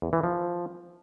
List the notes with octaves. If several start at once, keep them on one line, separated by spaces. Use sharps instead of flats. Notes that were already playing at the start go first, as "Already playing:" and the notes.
E2
E3
F3